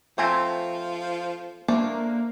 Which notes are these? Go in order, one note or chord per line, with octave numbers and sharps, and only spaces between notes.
F3 A3 C4 C5 G#5 A#5
A3 A#3 D4 C5